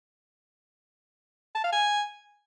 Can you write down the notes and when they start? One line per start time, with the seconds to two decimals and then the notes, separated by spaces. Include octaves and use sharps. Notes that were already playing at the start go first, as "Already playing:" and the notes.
1.55 A5
1.64 F5
1.72 G#5